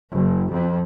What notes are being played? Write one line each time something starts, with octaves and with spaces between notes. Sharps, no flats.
F#1
F2